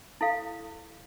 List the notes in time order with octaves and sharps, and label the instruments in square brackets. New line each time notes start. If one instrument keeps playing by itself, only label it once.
[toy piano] E4 A4 F5